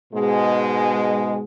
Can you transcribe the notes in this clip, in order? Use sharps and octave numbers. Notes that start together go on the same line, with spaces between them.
G#2 B2 G#3